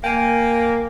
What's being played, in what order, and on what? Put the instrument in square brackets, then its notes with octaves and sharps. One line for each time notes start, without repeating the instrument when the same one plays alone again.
[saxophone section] A#3 [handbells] G5 G#5